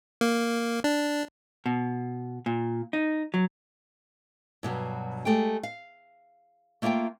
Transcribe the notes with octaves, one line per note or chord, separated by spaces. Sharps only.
A#3
D4
B2
A#2
D#4
F#3
G2 B2 E3 F#3
G#3 A3 G4 G5
F5
A3 A#3 F4 D#5 F5 G5